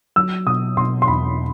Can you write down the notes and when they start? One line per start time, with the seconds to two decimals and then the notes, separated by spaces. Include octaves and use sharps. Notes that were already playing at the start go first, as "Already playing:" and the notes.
0.16 F#3 E6
0.47 B2 D#6
0.77 B2 C6
1.02 C6
1.08 E2 B5